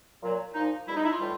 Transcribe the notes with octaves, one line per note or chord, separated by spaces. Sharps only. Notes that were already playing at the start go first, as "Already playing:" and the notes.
A#2 F#3
A#2 F3 D#4
E2 B2 G3 E4
D#4
E4
F4
A2 E3 G3